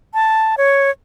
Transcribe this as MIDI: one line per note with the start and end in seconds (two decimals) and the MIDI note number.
0.14 0.55 81
0.58 0.90 73